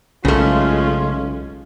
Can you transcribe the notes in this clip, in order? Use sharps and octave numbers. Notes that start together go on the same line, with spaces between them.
B1 C#3 G#3 A3 C#4 F4